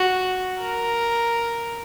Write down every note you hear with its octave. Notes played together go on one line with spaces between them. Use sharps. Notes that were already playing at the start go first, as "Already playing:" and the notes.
Already playing: F#4
A#4